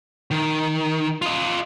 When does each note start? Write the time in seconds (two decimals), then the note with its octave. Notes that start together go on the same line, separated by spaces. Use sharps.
0.31 D#3
1.22 F4 D#5